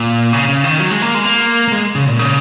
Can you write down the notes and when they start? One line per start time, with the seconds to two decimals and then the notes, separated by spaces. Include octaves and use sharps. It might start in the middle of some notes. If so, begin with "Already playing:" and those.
Already playing: A#2
0.33 C#3
0.48 C#3
0.64 D#3
0.79 F#3
0.91 G#3
1.02 A#3
1.15 G#3
1.25 A#3
1.68 A#3
1.72 G#3
1.95 C#3
2.07 A#2
2.19 C#3